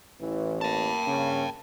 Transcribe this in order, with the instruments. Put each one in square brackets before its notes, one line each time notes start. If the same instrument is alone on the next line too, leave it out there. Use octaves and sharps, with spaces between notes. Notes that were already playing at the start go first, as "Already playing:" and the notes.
[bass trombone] A1 [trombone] E3
[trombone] A#3 [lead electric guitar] G5 A5
[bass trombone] C#3